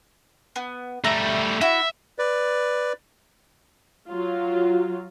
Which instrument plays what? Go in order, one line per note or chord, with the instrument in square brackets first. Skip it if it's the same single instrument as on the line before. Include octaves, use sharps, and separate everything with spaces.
[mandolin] B3
[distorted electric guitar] G3 A3 [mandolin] E5 A#5
[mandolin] E4 F#4 [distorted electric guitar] E5
[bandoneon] B4 D5
[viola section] F#3 F4